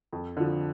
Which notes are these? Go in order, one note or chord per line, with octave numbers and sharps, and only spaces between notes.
F2
D3 F3